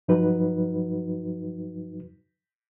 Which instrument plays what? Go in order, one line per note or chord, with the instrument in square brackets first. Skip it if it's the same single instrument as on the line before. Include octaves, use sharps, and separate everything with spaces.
[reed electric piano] G2 F3 F#3 D#4 F#4 B4